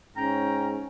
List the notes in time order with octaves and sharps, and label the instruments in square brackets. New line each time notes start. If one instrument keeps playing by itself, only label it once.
[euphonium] G#2 [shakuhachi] C#4 [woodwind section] G5 A#5